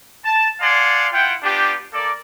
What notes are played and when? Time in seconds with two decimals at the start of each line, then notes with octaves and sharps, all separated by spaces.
0.24 A5
0.60 D5 F5 F#5 G#5 A5 C6
1.12 E4 F4 F#5 G5
1.43 B3 D4 F4 G4
1.93 A#3 A4 A#4 D5